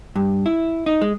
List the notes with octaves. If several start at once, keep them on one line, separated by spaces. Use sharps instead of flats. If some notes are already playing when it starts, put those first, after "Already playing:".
G2
E4
D#4
G#3